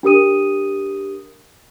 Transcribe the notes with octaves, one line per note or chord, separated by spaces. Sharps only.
D4 G4 A#4 D#6 D#7